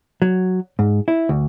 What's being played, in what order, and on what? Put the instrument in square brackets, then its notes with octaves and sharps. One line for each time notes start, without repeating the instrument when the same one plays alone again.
[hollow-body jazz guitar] F#3
G#2
E4
D2